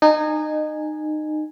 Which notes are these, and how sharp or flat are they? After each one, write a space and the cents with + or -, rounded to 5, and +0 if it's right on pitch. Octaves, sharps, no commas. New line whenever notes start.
D#4 -25 G#5 +0